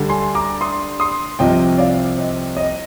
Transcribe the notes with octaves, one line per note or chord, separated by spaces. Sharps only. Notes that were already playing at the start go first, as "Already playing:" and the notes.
Already playing: D2 D3 G3
G#5 C6
A#5 D6
C6 D#6
C6 D#6
C2 C3 F3 C4 D#5 G5
D5 F5
D#5
D#5